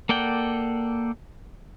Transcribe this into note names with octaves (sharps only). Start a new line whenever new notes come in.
A#3 A4 D5 F#5 G5